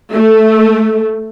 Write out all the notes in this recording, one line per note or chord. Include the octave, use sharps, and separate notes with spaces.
A3